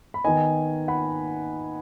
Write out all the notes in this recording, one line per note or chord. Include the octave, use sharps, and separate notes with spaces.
B5
D#3 B3 D#4 D#5 G#5
F#5 B5